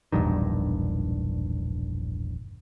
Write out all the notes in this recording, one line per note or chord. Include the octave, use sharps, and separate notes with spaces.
E1 A#1 G2 D#3